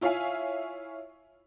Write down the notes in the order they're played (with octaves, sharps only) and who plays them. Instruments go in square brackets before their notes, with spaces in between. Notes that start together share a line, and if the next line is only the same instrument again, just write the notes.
[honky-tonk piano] E4 F4 C#5 E5 F5 G#5